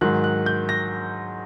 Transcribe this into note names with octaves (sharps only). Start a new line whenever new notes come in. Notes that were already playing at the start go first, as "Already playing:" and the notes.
G#2 D#3 F#3 F#6
F#6
G6
A#6